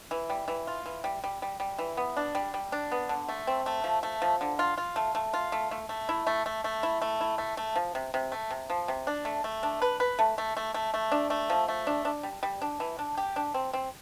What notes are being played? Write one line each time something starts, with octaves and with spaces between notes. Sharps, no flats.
E3
G3
E3
F4
E3
G3
G3
G3
G3
E3
B3
D4
G3
G3
D4
B3
D3
A3
C4
A3
F3
A3
F3
D3
F4
F4
A3
A3
F4
A3
A3
A3
E4
A3
A3
A3
E4
A3
E4
A3
A3
F3
C3
C3
A3
C3
F3
C3
D4
A3
A3
D4
B4
B4
A3
A3
A3
A3
A3
D4
A3
F3
A3
D4
D4
G3
G3
D4
E3
D4
G4
D4
C4
C4